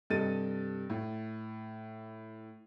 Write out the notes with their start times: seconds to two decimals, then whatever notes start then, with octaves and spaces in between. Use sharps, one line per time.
0.10 G2 C3 A4 D#5 A6 D#7
0.90 A2